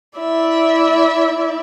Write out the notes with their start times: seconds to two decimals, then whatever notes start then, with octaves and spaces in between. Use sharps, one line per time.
0.19 E4 D5 E5